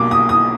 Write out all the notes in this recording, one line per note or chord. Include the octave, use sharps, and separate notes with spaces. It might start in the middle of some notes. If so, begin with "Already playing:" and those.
Already playing: B1 B2 G3 A#3 D6
D#6
D#6